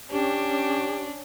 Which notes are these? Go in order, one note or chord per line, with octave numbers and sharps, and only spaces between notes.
C#4 D4 G4